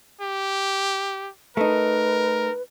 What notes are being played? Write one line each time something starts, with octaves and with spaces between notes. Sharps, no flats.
G4
A3 D#4 A#4 B4